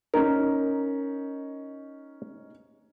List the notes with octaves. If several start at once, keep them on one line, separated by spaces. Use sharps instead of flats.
C#4 D#4 A#4